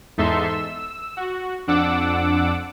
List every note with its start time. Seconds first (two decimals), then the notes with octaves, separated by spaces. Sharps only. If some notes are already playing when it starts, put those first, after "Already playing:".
0.17 E2 G#2 D#4 A4 E5 C6
0.49 E6
1.17 F#4
1.67 F2 D4 F#5 D6 E6